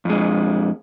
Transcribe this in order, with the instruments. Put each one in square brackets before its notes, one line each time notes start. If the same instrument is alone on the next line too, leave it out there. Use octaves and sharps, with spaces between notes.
[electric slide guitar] F2 G#3